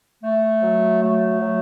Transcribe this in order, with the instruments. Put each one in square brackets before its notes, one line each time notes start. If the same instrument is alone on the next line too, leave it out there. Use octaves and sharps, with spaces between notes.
[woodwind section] A3
F#3
A3
F#3